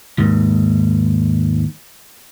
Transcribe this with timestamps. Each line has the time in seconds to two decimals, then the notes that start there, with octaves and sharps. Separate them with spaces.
0.18 D#2 G#2